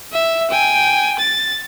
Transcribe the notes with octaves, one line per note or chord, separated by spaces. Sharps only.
E5
G5 G#5
A6